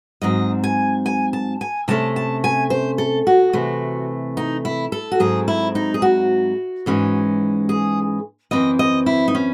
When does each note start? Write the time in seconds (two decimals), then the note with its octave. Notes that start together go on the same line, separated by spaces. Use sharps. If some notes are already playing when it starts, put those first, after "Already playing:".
0.22 G#2 F#3 C4 D#5
0.64 G#5
1.06 G#5
1.33 A5
1.61 G#5
1.88 C3 E3 A3 C#4 A5
2.16 A5
2.44 G#5
2.70 C5
2.98 A4
3.27 F#4
3.53 C3 E3 A3
4.37 D#4
4.65 E4
4.92 A4
5.11 F#4
5.20 G#2 F#3 C4 G#4
5.48 E4
5.75 D#4
5.94 G#4
6.02 F#4
6.86 G#2 E3 G#3 C#4
7.69 G#4
8.51 F#2 E3 C4 D#5
8.79 D#5
9.06 E4
9.28 D#4
9.35 C#4